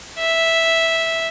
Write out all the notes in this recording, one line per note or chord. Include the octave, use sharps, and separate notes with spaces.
E5